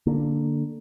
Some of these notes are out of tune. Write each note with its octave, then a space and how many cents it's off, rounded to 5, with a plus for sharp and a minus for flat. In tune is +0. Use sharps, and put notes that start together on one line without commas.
D3 +5 A#3 +0